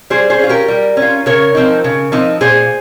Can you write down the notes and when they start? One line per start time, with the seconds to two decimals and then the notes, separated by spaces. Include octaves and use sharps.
0.10 G3 G#4 C5
0.30 G#4 C5
0.39 C#4 F4
0.49 G4 A#4
0.68 G3
0.97 C#4
1.02 F4
1.26 C#3 A#4 C#5
1.55 F3 C4 D#4
1.84 C#3
2.12 F3 C4 D#4
2.41 A#2 G#4 C5